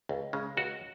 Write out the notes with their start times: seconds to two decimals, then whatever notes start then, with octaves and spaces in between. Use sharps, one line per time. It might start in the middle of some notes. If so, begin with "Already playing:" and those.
0.09 C#2
0.33 C#3 G#3
0.57 C#2 F#4